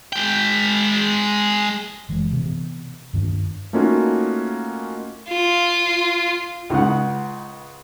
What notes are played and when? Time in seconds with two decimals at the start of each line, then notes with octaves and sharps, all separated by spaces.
0.13 G#3 G5
2.09 F#1 E3 F3 G#3
2.32 C3 E3 B3
3.13 G2 D#3 C#4 D4
3.73 A3 A#3 C#4 D#4 F4 F#4
5.28 F4
6.70 C#2 C#3 F#5